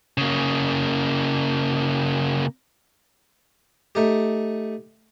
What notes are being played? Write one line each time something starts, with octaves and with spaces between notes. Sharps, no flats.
C#3 A#3
A3 D#4 G4